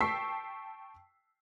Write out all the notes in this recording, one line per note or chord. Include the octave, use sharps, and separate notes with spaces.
G5 A5 C#6 E6 B6 C7